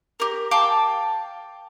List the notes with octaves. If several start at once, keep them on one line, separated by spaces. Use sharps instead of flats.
G4 A#4
F5 G5 A5 D6